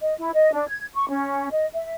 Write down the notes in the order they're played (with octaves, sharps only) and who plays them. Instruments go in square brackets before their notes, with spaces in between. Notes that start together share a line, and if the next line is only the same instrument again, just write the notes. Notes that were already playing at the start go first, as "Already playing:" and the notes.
[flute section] D#5
E4
D#5
D4
G#6
C#6
C#4
D#5
E5